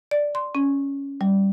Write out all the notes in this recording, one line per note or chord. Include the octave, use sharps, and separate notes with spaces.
D5
C6
C#4
G3